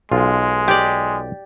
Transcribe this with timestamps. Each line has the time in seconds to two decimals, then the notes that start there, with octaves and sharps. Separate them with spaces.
0.12 B1 G#3 F4
0.68 G4 D5